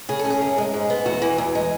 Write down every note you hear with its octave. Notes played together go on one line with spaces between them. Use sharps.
C#3 G#4
A4
C#4
G#4
F#2
G#3
G#2
B3
E2 F#4
E3
E2
G#3